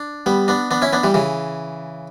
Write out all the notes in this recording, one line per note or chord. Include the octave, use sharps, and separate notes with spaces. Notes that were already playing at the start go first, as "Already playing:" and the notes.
Already playing: D4
G3 B3
B3 D4
B3 D4
C#4 E4
B3 D4
E3 G3
C#3 E3